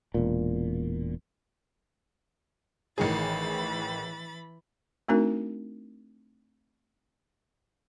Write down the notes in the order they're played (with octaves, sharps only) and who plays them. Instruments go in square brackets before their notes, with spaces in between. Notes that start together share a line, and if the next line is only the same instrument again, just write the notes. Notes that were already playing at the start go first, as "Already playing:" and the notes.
[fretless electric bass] E1 A#2
[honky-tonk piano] A1 D#3 G#4 [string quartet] E3 B5 A6
[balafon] A3 C4 D4 D#4 F#4 A#4